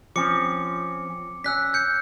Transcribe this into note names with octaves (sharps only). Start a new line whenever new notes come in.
F3 C4 C#4 D6 C#7
C#4 E6 F#6 B6
G6 C#7